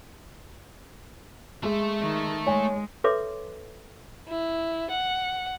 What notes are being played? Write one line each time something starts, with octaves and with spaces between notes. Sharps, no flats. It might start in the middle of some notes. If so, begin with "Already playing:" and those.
G#3 A3 E5
D#3
G#3 C#5 G#5
A4 B4 C#5 E5 C6 D6
E4
F#5